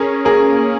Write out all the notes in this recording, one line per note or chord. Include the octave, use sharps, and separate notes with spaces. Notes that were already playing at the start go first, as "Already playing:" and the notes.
Already playing: C#4 G#4 A#4
A#3 G#4 A#4